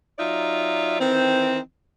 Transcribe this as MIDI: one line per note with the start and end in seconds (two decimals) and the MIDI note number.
0.19 0.96 54
0.19 0.96 63
0.19 0.96 65
0.19 0.96 74
0.19 0.96 76
1.00 1.58 51
1.00 1.58 52
1.00 1.58 60